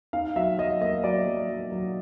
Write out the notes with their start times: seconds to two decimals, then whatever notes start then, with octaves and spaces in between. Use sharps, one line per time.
0.13 D#4 F5
0.36 F#3 E5
0.58 F#3 D#5
0.81 A#3 D#5
1.04 F#3 D5
1.27 F#3
1.49 F#3
1.72 F#3